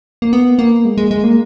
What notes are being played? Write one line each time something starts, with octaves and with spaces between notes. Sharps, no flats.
A#3
B3
A#3
G#3
G#3
G#3
A#3